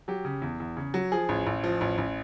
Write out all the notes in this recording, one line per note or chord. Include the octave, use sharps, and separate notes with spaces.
F#3 G4
C#3
E2
E2
C#3
F#3
F3 G#4
A1
A1
F3
A1
A1